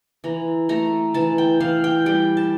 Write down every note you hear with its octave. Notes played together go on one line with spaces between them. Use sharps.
E3 A#5
A3 A#5
E3 A5
G5
E3 F5
G5
G3 G5
A5